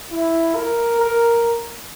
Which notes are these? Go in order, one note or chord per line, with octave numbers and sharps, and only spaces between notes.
E4
A#4
A#4